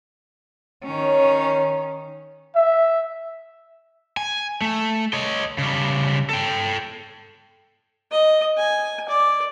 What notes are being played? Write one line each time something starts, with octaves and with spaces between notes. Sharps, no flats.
D#3 C#4 C#5
E5
G#5
A3
C#5 D#5
C#3 G3
A4 G5
D#5
G#5
D5